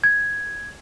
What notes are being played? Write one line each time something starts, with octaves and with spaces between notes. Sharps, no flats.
G#6